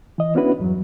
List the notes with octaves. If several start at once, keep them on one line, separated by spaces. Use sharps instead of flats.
E3 D#5
B3 C#4 D4 E4 F#4 B4
E2 G2 F#3